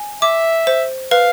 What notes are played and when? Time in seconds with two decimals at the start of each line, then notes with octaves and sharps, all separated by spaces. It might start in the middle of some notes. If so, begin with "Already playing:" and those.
Already playing: G#5
0.22 E5 D6
0.67 C5
1.11 B4 F5